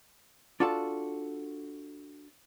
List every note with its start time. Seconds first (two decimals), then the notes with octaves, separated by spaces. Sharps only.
0.60 D4 F4 F#4 A4 A5